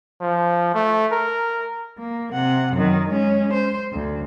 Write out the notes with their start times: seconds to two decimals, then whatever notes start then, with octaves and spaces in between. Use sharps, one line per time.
0.21 F3
0.75 A3
1.12 A#4
1.98 A#3
2.33 C3 F#5
2.74 F#2 D#3
3.09 G#3 C#4
3.53 C5
3.92 D2